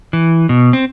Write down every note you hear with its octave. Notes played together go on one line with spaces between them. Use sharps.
E3
B2
C4